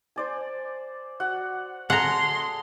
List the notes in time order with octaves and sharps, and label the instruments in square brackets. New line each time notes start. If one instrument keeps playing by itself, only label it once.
[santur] C5 D5 G#5
F#4 F#5
[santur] G#4 A4 [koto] F#5 A#5 [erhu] C6